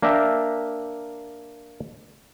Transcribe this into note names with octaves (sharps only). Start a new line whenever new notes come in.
A#3 D4 A#4 E5 G5 A#5